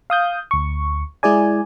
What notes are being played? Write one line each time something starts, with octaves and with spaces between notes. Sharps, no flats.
F5 D#6 G6
D2 C#6
G#3 E4 G#4 D5 G#5